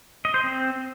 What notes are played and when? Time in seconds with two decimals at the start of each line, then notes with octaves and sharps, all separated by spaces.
0.25 D#5
0.34 C5
0.43 C4